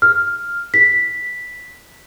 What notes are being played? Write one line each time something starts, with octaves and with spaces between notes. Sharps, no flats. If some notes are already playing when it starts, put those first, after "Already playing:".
F6
B6